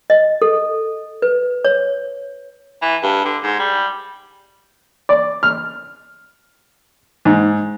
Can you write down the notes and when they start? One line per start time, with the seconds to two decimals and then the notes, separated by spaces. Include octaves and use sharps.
0.10 D#5
0.42 A4
1.22 B4
1.65 C#5
2.82 E3
3.03 G2
3.25 D3
3.43 G#2
3.59 G3
5.09 D5
5.43 F6
7.25 G#2